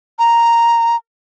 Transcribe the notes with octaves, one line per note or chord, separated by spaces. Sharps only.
A#5